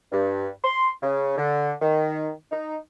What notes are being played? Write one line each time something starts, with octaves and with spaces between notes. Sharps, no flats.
G2
C6
C#3
D3
D#3
D#4